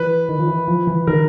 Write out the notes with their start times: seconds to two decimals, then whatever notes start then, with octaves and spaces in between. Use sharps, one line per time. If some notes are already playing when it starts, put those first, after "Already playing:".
Already playing: E3 B4
0.29 D#3
0.39 F3
0.48 E3
0.68 F3
0.87 E3
1.07 D#3 A#4